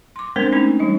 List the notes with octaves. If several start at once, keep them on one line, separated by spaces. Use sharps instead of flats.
C6 D6
G#3 B3 C4 D4 A#4 C5
A3 B3 C#4 D#4
E3 G3 D#4 D#5